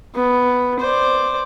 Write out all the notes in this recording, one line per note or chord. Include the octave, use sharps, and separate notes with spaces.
B3
C5 D5